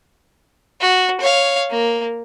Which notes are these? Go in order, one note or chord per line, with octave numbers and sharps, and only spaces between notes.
F#4
C#5 F5
A#3